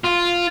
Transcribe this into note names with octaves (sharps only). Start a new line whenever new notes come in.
F4